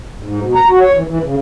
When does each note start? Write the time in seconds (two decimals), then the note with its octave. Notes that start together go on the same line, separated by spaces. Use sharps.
0.23 G#2
0.41 B2
0.55 A#5
0.69 F#4
0.81 C#5
0.94 E3
1.08 E3
1.24 C#3